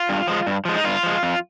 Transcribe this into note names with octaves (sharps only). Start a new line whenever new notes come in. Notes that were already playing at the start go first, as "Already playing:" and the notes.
Already playing: F4
G2
F3 G#3
G2
F3 G#3
D#4
G2 F4
F3 G#3
F2